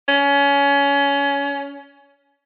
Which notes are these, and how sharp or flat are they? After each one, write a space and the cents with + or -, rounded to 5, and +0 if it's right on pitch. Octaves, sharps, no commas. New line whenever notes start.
C#4 +25